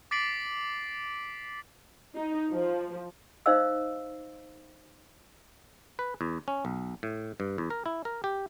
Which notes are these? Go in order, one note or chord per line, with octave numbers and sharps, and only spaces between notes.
D6 A6 B6 C7 D7 F#7
D#4
F3
D#4 C5 D#5 F5 E6
B4
E2
C#4
B1
A2
G2
E2
A#4
E4
A#4
G4